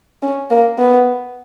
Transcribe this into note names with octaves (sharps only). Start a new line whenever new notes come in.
C#4
A#3
B3